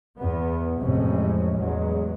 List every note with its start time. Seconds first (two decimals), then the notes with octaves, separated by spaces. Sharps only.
0.18 E2 B3
0.80 A1 F2 A2 C3 G#3 C#4
1.57 A1 E2 F#3 G#3